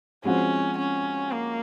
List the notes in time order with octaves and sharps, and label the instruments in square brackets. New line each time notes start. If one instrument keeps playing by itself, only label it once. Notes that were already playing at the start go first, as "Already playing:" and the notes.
[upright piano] F3 G#3 C4 F#4 C5 [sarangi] C#4
[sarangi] C#4
A#3